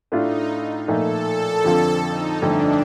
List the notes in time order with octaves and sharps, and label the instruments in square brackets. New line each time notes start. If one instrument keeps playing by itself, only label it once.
[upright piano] A2 A3 D4 F4 [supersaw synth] D#4
[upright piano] A#2 F3 A3 D#4 [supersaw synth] A4
[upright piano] F2 D3 F3 C4 F4
[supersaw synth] D#4
[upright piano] G1 F2 D3 A3 D#4 [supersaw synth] D4